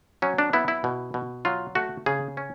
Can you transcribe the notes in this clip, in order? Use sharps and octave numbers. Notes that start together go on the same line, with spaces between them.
F#3 C#4
D4
B3 E4
E4
B2
B2
F#3 F4
A3 F#4
C#3 G#4
C#4